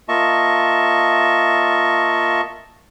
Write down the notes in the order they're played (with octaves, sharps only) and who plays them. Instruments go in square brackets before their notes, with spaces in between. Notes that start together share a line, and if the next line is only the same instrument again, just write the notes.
[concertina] A#3 F4 D#5 E5 A5 C#6